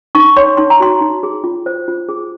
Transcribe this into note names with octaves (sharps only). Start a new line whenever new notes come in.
D#4 C#6
C#5 C6
D#4 C6
A#5
F#4 C6
D#4
G#4
F4
C5
F4
G#4